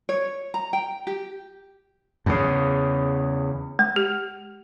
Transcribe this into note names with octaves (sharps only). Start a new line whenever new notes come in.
C#5
A#5
G5
G4
E2 C#3
G#3
G4